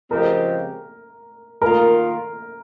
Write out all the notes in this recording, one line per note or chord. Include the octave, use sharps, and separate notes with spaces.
C#3 F3 G#3 C4 G4 A#4
D#3 A#3 F4 A#4